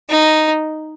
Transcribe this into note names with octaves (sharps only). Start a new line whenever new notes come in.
D#4